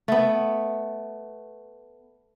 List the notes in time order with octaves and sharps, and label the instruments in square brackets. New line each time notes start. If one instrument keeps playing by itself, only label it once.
[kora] A3 B3